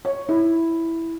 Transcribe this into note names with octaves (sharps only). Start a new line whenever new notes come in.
C#5
E4